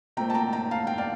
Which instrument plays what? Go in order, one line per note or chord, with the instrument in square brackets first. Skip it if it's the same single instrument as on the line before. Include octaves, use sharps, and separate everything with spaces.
[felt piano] A#2 A3 C4 G5 A#5
A5
G5 A#5
G5 A#5
F5 A5
G5
D5 F5